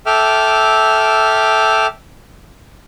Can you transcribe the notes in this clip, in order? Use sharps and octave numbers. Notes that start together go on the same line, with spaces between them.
A4 E5 G5 D6 F6